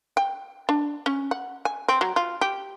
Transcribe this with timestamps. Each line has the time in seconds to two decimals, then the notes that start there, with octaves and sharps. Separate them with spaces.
0.17 G5
0.69 D4
1.06 C#4
1.31 F#5
1.65 G#5
1.88 C4
2.01 F#3
2.16 F4
2.41 G4